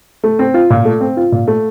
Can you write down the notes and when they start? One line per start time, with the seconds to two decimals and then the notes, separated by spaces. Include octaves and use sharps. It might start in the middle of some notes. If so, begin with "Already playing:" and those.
0.24 A3
0.39 C4
0.54 F4
0.70 A#2
0.85 A3
1.01 C4
1.17 F4
1.32 A#2
1.47 A3